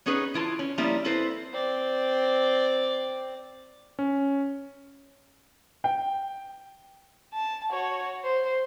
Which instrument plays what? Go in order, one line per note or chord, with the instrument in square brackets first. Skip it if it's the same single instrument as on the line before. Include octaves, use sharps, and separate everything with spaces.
[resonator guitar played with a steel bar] B3 C#4 D#4 G#4 B4 C#5
E3 E4 F4 A5
C#4
F3 G3 A#3 B3 C#4 E4
C4 E4 A4 B4 C5
[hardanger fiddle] C4 D5
[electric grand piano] C#4
[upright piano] G5
[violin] A5
F#4 C#5
C5